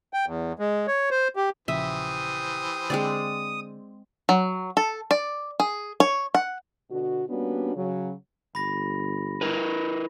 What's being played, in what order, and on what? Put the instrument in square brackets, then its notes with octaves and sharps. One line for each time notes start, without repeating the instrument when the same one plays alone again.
[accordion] G5
E2
G#3
C#5
C5
G4
[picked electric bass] A#1 C#3 F3 [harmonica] E3 G4 C5 [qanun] E5 [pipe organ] D#6
[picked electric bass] D3 [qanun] G#3 C4 D5
[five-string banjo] F#3
A4
D5
G#4
C#5
F#5
[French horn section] B2 D3 F#4
G3 A#3 B3 C#4 D4 F#4
C#3 F#3
[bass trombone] G1 [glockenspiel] B5 A#6
[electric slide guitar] E4 A#4 B4